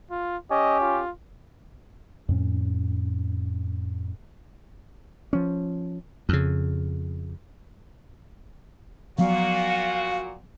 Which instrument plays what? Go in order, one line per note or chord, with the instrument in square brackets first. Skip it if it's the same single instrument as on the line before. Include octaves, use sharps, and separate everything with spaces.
[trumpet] F4
[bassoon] C#4 [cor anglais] G4 [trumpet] D#5
[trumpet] F4
[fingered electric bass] F2 A2 C#4
[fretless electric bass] F3 C#4
[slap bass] F2 C#3
[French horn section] A#2 F#4 [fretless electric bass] F3 F#3 B3 [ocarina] F5